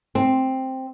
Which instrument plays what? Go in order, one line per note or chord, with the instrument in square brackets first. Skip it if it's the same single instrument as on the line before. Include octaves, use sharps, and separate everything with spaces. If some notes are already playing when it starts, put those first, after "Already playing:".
[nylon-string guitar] C4